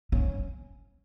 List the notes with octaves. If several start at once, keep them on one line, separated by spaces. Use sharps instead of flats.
C#4